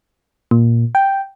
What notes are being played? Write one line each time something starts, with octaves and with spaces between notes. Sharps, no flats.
A#2
G5